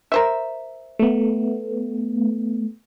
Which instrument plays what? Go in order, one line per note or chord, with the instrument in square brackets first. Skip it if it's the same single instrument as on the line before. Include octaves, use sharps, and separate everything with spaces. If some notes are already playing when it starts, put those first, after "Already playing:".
[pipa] A#4 C5 E5
[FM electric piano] A3 B3